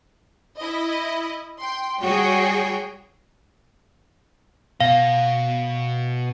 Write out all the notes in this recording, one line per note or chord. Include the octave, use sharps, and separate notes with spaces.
E4 D#5
G5 C6
G3 F#4 G#4 C#5 G5
B2 F5